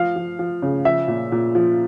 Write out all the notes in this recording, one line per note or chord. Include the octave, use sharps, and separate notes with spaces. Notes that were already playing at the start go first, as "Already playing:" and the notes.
Already playing: F3 F5
F3
F3
C#3
F3 E5
A#2
A#2
F3